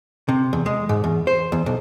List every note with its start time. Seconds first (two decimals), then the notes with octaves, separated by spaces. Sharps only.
0.29 C3
0.53 E2
0.66 G#3
0.89 G#2
1.04 E2
1.27 C5
1.52 E2
1.66 B1